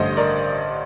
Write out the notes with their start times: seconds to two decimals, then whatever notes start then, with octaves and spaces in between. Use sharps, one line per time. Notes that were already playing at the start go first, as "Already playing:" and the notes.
Already playing: A1 G2 D3 C5 D#5
0.17 A#4 D5